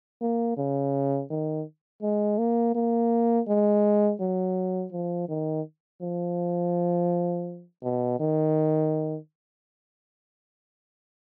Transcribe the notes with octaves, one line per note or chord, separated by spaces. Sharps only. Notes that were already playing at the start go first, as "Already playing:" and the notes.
A#3
C#3
D#3
G#3
A#3
A#3
G#3
F#3
F3
D#3
F3
B2
D#3